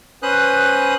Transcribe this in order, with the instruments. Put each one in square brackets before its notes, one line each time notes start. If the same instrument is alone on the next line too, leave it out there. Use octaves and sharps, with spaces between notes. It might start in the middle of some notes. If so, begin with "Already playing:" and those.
[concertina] C#4 B4 C5 D#6 F#6